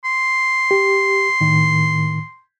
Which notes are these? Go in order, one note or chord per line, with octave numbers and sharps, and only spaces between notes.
C6
G4
A2 D#3